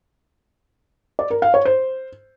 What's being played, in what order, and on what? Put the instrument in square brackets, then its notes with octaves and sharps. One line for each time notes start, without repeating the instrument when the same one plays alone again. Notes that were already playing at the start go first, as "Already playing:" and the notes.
[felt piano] D5
A#4
F5
C#5
C5